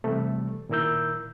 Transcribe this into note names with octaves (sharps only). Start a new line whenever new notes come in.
C3 E3 G3 A3
A#2 D#3 E4 A#4 E6 G6